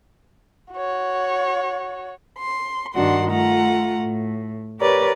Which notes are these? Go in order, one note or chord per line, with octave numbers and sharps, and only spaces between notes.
F#4 C#5
C6
G2 D#3 D4 F#4 F#5 C6
A3 F4 F#5 A#5
A2
G4 A#4 B4 C#5 D5